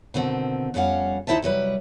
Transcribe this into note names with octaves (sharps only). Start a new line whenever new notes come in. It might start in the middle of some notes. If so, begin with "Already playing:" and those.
B2 D3 D#3 C4
F2 G3 C#4 F5 F#5
D2 D#4 E4 C5 E5 A5
C3 F#3 G3 B4